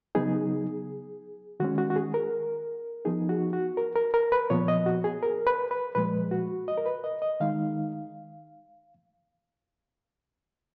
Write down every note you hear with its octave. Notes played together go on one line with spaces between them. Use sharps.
C#3 F#3 B3 D#4 G#4
D#3 G#3 C#4 F#4
F#4
F#4
G#4
A#4
F3 B3 D#4 G#4
F#4
F#4
A#4
A#4
A#4
B4
A#2 F3 B3 C#5
D#5
F#4
G#4
A#4
B4
B4
A#2 F3 G#3 B4
F#4
D#5
A#4
B4
D#5
D#5
D#3 G#3 D#4 F5